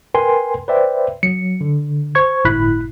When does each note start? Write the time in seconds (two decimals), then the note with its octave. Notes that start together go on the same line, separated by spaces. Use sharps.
0.14 A#4 B4 G5 G#5 C6
0.68 B4 C5 D5 E5 G5
1.23 F#3 C#7
1.61 D3
2.15 C5 C#6 G#6
2.45 G1 A2 E4 B5 F#6 B6